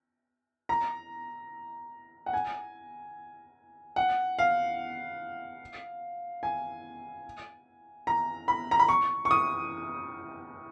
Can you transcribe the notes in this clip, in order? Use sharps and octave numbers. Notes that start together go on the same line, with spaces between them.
A#5
F#5
G#5
F#5
F5
G#5
A#5
B5
A#5
B5
C#6
C#6
D#6